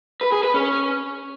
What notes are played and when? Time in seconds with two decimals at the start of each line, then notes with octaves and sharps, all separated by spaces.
0.21 B4
0.32 G#4
0.43 B4
0.54 C#4